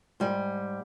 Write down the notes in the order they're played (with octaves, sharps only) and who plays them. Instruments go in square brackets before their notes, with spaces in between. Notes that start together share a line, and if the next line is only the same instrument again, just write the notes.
[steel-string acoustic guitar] G#2 G3